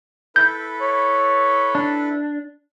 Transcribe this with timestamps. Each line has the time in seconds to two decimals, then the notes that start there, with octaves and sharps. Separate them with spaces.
0.36 E4 A4 B4 G6
0.81 C#5
1.75 D4